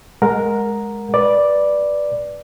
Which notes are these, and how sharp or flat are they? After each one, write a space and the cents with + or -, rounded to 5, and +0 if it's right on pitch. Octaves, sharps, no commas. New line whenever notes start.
G#3 +0 A#4 +0 F#5 -25
B4 -10 D5 +0